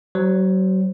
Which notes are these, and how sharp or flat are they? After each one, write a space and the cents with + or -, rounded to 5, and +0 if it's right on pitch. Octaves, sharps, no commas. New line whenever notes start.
F#3 +35 C5 +0